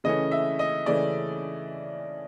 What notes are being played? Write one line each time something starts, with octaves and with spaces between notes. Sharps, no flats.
C#3 E3 A3 C#4 D#5
E5
D#5
C#3 E3 A3 C#4 D5